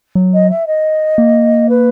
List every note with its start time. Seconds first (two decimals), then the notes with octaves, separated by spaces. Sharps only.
0.15 F#3
0.33 D#5
0.50 E5
0.66 D#5
1.18 A#3
1.69 B4